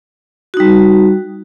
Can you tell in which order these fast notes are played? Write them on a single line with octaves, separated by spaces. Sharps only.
F#4 D#4 G3